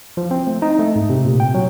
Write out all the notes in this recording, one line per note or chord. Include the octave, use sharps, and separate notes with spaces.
F3
C4
A3
D#4
A3
G#2
C3
A#2
G5
F#3